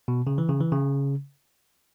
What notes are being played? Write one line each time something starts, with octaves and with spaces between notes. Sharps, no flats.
B2
C#3
E3
C#3
E3
C#3